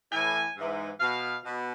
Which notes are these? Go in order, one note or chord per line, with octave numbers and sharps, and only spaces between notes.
A2 E3 G#5
G#2 E3
B2 F5
B2